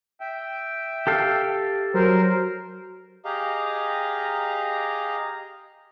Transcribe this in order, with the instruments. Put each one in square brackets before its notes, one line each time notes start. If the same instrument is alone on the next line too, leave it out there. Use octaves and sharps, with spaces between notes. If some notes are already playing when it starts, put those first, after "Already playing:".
[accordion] E5 G5
[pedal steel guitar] G4 A4 F5
[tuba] F#3 [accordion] A#4 C5
[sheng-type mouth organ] G4 G#4 D#5 F5 A#5